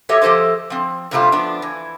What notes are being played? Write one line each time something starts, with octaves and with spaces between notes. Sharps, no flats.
F#3 G4 A4 C#5 D#5 E5
F3 G4 A4 C5 D#5
F3 C4
G2 C3 G3 A3 F4
F3 B3 D4
E3